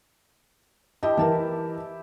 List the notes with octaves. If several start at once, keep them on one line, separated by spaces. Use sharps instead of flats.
E4 G4 D#5 A5
E3 E4 A#4 A5